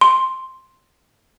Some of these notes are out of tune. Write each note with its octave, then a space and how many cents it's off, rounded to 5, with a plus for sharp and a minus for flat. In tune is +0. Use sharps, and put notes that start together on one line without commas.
C6 +5